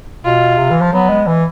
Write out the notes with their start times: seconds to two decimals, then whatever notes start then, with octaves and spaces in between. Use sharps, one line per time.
0.24 B2 F4
0.58 C3
0.71 E3
0.81 F3
0.92 F#3 B3
1.09 G#3
1.27 E3